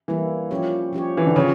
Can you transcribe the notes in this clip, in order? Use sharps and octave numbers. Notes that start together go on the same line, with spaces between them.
E3 G3 A#3 E4
F3 C#4 G4 C#5
F3 C#4 G4 C#5
E3
D3
C#3 F3 C#4 G4 C#5